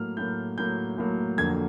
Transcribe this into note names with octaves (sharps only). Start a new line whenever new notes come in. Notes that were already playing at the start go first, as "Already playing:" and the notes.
Already playing: A2 F#3 A#3 F6
A2 F#3 A#3 G6
A2 F#3 A#3 G6
A2 F#3 A#3
F2 D3 F#3 A#3 G#6